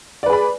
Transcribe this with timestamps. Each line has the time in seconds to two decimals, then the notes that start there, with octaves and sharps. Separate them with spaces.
0.23 D5
0.26 B4
0.30 G#4
0.33 B5